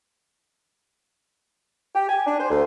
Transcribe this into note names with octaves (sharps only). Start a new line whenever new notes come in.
G4
G#5
D4
C5
D2